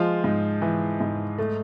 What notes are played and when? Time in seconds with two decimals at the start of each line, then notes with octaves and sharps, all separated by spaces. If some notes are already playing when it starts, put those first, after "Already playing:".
Already playing: F3 G#3 F4
0.24 G#2
0.62 E3
1.01 G#2
1.38 A3